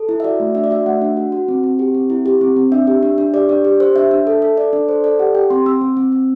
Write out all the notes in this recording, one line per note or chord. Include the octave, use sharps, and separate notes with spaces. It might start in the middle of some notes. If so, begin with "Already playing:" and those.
Already playing: A4
E4
E5
F#4 D5
A3
D4 E5
D5
F#4 E5
A3 F#5
D4
F#4
F#4
C4
C4
G4
C4
E4
G4
C4
C4
D4 E5
G4
D4
D4
G4 D5
D4 D5
G4
G4 C5
D4 E5
D4
A4
A4
A4 D5
D4 D5
A4 C5
A4 D5
G4 F#5
G4 G5
C4 C6
C4 E6
C4
C4
C4